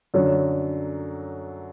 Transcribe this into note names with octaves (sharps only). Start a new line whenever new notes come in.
F#2 D3 F#3